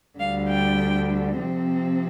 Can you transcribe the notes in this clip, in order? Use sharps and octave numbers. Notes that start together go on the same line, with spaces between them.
D2 D3 G3 F5
G5
C3 F3 C4